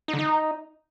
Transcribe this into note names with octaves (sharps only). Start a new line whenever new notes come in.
D#4
D3
D#4